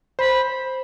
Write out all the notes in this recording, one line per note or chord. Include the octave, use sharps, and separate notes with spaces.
C5 B5